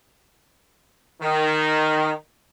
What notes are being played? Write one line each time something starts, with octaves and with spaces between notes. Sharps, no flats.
D#3